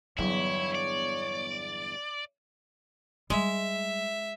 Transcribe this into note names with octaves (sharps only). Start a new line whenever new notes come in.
G1 E2 F#3 E4 C#5
D5
G3 G#3 E5